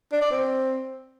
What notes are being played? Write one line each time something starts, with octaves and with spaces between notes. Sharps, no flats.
D4
D5
C4